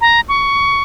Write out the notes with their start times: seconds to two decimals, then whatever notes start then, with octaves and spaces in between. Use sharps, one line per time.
0.01 A#5
0.29 C#6